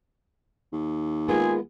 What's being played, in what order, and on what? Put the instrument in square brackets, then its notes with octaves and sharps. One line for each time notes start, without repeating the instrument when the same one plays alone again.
[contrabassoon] D#2
[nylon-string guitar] G#3 A#3 B3 [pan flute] F4 [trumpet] G#4